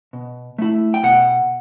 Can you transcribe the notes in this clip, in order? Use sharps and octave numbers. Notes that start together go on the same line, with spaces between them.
B2
A3 E4
G5
B2 F#5